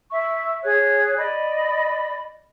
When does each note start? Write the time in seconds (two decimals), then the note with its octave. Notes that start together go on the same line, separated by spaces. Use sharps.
0.11 E5 C#6
0.64 G#4 C#5 F#6
1.17 D5 D#5 B5